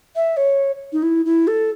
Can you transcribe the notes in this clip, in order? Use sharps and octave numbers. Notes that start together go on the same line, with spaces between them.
E5
C#5
D#4
E4
E4
A4